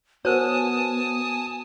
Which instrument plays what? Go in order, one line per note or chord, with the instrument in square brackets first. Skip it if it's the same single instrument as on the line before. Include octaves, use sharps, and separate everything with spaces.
[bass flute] B3 [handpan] F#4 [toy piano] A#4 C5 C#5 [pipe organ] G#5 A5 D#6